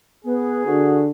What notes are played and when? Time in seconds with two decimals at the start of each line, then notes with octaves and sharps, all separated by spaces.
0.24 B3 G#4
0.66 D3 F#4